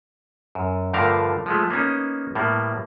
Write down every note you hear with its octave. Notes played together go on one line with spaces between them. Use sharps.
F#2
G2 D3 F3 A3 A#4 F5
F3 G#3 A3
A#3 B3 C#4 D#4
A2 G3 A#3 B3